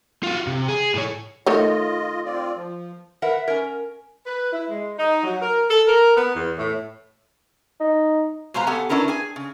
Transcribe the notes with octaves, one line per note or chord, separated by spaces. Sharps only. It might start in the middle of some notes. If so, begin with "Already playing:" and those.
F4 F#4
C3
G#4
A2 C#5
D#3 A3 F4 C#5 D#5
C4 F4 D5
F3
A#4 B4 E5 F#5
C#4 A#4
B4
E4
G#3
D#4
F#3
A#4
A4
A#4
B3
E2
A2
D#4
B2 G#3 B4 C5 F5 A#5
B3 G4 A4 F#5 G#5
C#4 D4 E4 A#4 B4
G#4 G#5
C#3